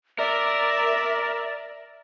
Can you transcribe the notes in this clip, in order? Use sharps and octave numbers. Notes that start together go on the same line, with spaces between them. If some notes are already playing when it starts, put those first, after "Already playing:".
A#4 D5 E5